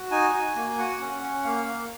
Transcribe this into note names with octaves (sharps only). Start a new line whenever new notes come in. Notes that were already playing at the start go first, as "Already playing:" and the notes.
Already playing: F#4
D#4 G#5
F#4
A#3
F#4 F#5
C#4
C#4
A#3 F5
A#3